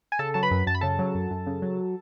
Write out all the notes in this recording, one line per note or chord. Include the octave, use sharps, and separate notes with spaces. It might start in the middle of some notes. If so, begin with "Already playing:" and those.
G#5
C#3 A4 A5
F#3 A5
B4 B5
F#2
F#2 A5
B5
C#3 A4 A5
F#3
F#2
F#2
C#3
F#3